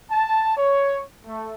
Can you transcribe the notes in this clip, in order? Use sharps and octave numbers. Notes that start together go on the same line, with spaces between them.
A5
C#5
A3